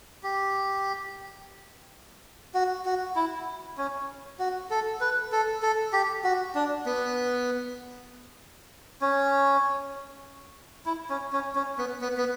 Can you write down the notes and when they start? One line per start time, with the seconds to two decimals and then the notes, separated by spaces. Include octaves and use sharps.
0.23 G4
2.54 F#4
2.85 F#4
3.16 E4
3.78 C#4
4.39 F#4
4.71 A4
5.01 B4
5.32 A4
5.62 A4
5.93 G4
6.24 F#4
6.55 D4
6.86 B3
9.01 C#4
10.86 E4
11.10 C#4
11.33 C#4
11.55 C#4
11.78 B3
12.01 B3
12.17 B3